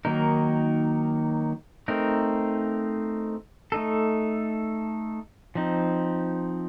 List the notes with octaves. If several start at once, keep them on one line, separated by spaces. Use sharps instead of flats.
D#3 F#3 A#3 D#4 A#4
A3 C4 D#4 A#4
A3 D#4 A4
F3 C4 D#4